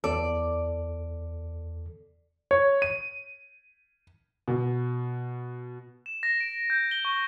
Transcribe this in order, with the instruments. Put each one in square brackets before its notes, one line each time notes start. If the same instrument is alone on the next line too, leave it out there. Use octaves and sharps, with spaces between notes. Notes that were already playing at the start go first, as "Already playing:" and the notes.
[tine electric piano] E2 A4 [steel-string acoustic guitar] D5
[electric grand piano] C#5
D#7
[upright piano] B2
[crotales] E7
A#6
D7
G6
G7
C#6